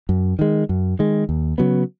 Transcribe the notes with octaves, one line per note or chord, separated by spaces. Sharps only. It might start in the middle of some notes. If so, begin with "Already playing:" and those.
F#2
D#3 G#3
F#2
D#3 G#3
D#2
C#3 F#3 B3